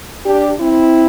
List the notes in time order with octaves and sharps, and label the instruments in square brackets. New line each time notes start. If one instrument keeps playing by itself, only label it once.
[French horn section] D4 G4
C4 E4